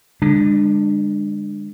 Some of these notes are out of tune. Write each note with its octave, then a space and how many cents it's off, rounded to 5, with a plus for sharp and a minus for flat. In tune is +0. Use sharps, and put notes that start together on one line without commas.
D3 +0 G#3 -30 D4 +20